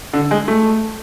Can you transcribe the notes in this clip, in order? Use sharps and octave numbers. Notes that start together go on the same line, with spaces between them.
D3
G#3
A3